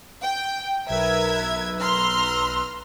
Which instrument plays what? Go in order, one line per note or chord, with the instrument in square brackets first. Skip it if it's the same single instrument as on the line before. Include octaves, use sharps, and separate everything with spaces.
[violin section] G5
[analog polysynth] B1 B4 E6 [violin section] A#4 E5 G#6
[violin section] A#5 C6 F6